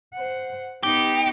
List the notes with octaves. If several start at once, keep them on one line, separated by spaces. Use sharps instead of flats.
C5 F#5
B3 D#4 G4